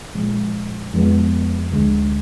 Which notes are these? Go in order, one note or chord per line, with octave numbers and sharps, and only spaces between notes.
A#2 F3 G#3
F2 F3 G#3 B3
D2 D3 G#3